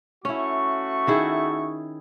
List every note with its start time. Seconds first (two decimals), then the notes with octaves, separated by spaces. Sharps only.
0.25 A3 C#4 E4 F#4 C#6
1.07 D#3 E4 G#4